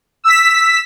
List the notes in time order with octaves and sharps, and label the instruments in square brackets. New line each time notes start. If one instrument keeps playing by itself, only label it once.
[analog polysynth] E6 B6